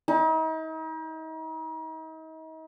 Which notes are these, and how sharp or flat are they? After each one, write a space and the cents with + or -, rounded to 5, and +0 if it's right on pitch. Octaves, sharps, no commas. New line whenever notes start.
D#4 +40